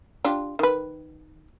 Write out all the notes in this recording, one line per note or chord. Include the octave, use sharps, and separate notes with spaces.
D4 F4 G4
D#3 B4